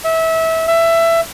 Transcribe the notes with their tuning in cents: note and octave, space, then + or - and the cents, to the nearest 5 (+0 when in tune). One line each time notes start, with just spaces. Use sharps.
E5 -25
E5 +15